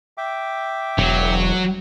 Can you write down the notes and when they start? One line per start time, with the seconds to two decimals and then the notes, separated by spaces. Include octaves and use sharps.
0.18 E5 G5 D6
0.98 E1 F#3